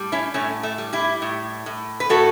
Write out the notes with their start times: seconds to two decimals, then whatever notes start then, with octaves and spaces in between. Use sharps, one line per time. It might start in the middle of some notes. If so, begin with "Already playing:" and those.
Already playing: A2 G3
0.12 C#4 E4
0.34 A2 A3 C#4
0.63 A3
0.78 G3
0.93 E4 G4
1.22 A2
1.66 A2
2.00 B4
2.09 A2 F#4 A4